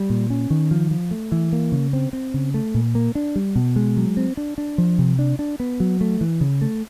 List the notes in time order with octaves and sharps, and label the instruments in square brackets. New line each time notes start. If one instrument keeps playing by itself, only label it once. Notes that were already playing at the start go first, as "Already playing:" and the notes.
Already playing: [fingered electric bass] G3
A#2
C#4
D#3
F3
F3
A3
E3
A#3
C#3
C4
C4
C#3
A3
A#2
A#3
D4
G3
B2
G#3
F#3
C4
D4
D4
F3
C3
D4
D4
B3
F#3
A3
E3
C#3
A3